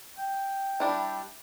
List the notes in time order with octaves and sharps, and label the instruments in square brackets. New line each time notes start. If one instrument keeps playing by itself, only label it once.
[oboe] G5
[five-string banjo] G3 D4 E4